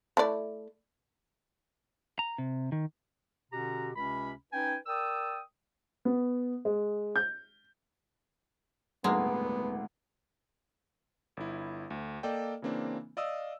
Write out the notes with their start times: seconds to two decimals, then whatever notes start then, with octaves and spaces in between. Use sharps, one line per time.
0.17 A3 E4 D5
2.19 A#5
2.38 C3
2.72 D#3
3.52 B2 D3 C#4 F#4 G4 A#5
3.96 C#2 C3 C#4 B5
4.53 C#4 D#4 B4 G5 G#5
4.87 A#4 D5 G5 D#6 E6
6.05 B3
6.65 G#3
7.16 G6
9.04 D#1 G#1 D2 G#3 A#3 B3 F#5
11.37 G1 E4
11.90 D2
12.23 A#3 A4 D5 D#5 G5
12.62 C#3 E3 A#3 C4 D4
13.17 D5 D#5 F5 D#6 E6